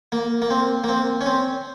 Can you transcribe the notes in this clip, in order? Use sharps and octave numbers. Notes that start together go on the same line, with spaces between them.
A#3
A#3
C4
A#3
C4
C#4
C4